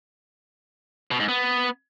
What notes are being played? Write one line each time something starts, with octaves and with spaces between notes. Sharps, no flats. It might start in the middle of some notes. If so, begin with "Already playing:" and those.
B2
G#2
B3